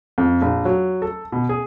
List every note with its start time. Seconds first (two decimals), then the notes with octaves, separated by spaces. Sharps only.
0.18 F2
0.41 A#1
0.65 F#3
1.02 A4
1.32 B2
1.49 G#4